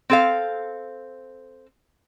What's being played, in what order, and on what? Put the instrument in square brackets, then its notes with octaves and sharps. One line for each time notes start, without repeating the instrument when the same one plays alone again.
[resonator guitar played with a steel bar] C4 A4 F5